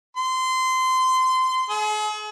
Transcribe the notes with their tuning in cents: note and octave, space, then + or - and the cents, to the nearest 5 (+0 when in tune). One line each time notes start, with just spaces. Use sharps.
C6 -20
G#4 +40